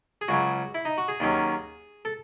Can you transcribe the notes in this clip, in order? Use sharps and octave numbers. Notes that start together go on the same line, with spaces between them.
G#4
C#2 C#3 F#3 F#4
E4
D#4
F#4
G#4
D#2 D#3 F#3 C#4
A4